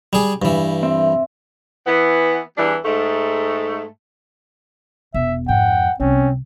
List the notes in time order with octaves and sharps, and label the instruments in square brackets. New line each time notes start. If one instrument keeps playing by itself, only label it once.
[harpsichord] G3 G#4
G2 E3
[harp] C4 E5
[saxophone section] E3 B3
E2 E3 G3 D4
G#2 A3
[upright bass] E1 [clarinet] E5
[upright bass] F2 G#2 [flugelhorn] F#5 [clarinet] G5
[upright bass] C2 [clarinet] C4 [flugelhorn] C#4